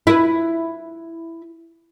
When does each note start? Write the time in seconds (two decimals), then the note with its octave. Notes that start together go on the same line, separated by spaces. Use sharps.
0.07 E4 B4